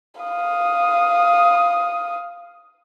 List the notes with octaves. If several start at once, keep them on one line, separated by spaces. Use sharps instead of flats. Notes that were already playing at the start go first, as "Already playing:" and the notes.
F5 D#6